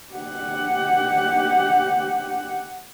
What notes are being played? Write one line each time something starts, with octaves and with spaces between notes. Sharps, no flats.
G4 F#5